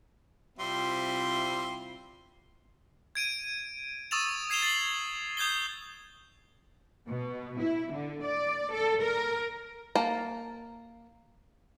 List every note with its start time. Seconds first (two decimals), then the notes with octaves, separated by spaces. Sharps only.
0.59 C3 G3 C4 E4 F4 E5 C6
3.15 G#6 D7 D#7
4.11 C#6 D#6 E6 A6 E7 F7
4.50 G#6 C7 E7 F7 G7
4.62 A6 C7 F#7 G7
5.37 D#6 G6 G#6 C7 G7
7.09 B2
7.61 E4
7.93 D3
8.24 D5
8.72 A4
9.02 A#4
9.95 A#3 A5 A#5